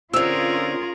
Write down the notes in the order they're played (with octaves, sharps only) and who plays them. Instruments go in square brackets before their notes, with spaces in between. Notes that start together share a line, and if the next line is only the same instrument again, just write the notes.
[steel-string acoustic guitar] D3 C4 [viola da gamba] C#4 G#4 A#4 [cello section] F4 [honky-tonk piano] E6 F7